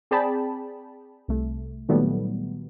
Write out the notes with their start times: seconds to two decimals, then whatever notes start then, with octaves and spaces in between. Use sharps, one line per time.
0.11 C4 G#4 D5 G5 A5 B5
1.28 C2 A3
1.89 A#2 D#3 F#3 G3 A3 B3